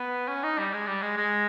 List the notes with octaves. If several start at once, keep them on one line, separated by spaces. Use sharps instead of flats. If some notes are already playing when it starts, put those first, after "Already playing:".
Already playing: B3
C#4
D#4
G3
G#3
G3
G#3
G#3